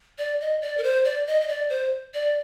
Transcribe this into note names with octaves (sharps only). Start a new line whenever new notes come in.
D5
D#5
D5
A#4
C5
D5
D#5
D#5
D5
C5
D5